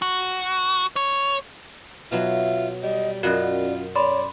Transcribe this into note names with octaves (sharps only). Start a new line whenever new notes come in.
F#4
C#5
B2 F#3 F4 E5
G3 D#5
F#2 C#4 F4 F#4 D5 D#5 F#5
C#5 D5 B5 C6